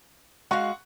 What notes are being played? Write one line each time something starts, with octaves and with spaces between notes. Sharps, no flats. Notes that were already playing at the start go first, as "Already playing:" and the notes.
G#3 F#4 F5 F#5 C#6